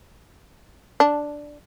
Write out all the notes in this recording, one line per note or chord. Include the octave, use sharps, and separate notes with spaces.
D4